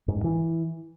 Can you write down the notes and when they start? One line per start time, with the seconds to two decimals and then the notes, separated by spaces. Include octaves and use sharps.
0.08 G#2
0.16 G2
0.24 E3